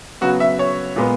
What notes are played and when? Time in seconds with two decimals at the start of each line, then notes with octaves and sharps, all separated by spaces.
0.21 C#3 F#3 B3 F#4
0.40 E5
0.59 C#5
0.96 A#2 G#3 B3